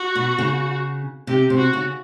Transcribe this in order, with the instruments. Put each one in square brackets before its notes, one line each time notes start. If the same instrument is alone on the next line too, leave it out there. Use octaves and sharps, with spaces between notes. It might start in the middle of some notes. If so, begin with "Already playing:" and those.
Already playing: [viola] F#4
[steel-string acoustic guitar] B2
C#3
[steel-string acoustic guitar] C3 [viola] G4
[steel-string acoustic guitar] C3
[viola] F#4
[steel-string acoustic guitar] C#3